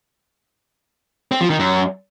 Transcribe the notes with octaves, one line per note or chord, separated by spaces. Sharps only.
C4
F3
D#3
F#2